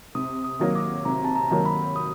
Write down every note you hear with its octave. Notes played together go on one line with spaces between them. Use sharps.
C3 D#6
D#6
D#3 F#3 A#3
D6
C3 A#5
A5
A#5
D#3 F#3 A#3
B5
D#6